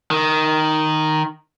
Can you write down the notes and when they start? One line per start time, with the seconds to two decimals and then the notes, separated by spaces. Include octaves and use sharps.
0.11 D#3